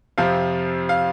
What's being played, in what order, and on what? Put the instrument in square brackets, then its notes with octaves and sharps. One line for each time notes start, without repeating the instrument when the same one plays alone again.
[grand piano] F2 C3 F3 F5
F5